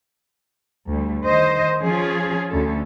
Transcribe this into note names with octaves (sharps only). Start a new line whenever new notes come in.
D2 G3
D#3 C5 D#5
F3 C#4 F4 G#4
D2 C#4 A4